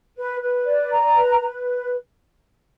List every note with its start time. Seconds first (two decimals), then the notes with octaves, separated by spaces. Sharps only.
0.16 B4
0.41 B4
0.66 D5
0.90 A#5
1.16 B4
1.40 B4